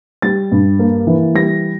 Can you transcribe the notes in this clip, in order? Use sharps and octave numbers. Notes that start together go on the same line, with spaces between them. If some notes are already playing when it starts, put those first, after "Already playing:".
G3 A6
G2
A#3
E3
G3 A#6